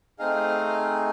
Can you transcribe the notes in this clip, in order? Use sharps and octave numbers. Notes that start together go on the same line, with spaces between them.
A3 C4 D#4 G#4 D#5 F5